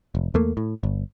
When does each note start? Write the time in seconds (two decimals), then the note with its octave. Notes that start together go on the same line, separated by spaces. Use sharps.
0.15 F1
0.34 E2 A3 A#3
0.57 A2
0.83 G1